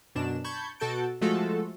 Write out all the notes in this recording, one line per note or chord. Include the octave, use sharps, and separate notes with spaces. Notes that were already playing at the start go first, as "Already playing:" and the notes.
F#2 B2 D4 E7
A5 B5 C#6 G6 G#6
B2 F#4 A4 A5 G6 D7
F3 G#3 A3 F4 F#4 A4